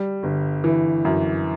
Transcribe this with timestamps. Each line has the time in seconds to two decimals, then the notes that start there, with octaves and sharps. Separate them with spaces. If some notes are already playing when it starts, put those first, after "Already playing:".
Already playing: G3
0.23 G1
0.64 E3
1.05 F#2